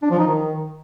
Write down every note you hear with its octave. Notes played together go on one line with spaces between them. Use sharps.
D4
F3
D#4
D#3